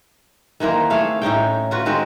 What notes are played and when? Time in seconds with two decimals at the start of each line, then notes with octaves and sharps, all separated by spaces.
0.60 D#3 E3 A#3 C4
0.90 A3 G#4 F5
1.22 A2 C#4 D#4 G5
1.71 F4 F#4 B4
1.86 D#3 G#3 C4 F#4